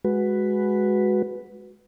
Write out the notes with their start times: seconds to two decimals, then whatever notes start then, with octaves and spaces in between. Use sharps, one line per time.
0.04 G#3 F#4 B4